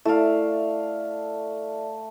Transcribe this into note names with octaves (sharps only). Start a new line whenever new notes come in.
A3 E4 D5 E5 F5